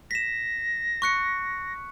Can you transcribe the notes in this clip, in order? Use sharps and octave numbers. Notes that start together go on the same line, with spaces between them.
A#6 B6 E7
C#6 F#6 C#7